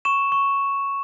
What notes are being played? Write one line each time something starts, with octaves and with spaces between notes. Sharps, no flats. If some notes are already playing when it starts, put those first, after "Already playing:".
C#6 E7
C#6